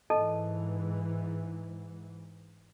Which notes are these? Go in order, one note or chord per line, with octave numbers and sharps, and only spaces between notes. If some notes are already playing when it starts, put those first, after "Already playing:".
G#2 E3 A4 D#5 A5